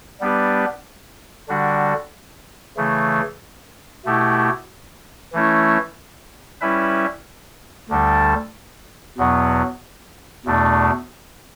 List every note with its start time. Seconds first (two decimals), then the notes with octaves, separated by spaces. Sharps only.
0.21 G3 B3 D4 G4 B4
1.49 D3 G3 D4 F#4
2.77 C#3 E3 A3
4.05 B2 A3 E4 G4
5.33 E3 A3 C#4 E4
6.61 G3 C#4 E4 B4 E5
7.89 D2 D3 G3 D4 A4
9.18 E2 B2 F#3 B3
10.45 E2 B2 A3 D4